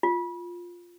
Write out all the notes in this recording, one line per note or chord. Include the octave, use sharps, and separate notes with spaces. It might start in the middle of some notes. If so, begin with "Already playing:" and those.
F4